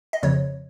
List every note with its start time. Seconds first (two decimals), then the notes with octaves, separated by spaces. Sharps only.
0.13 D#5
0.23 F2 C#3 F3 C#5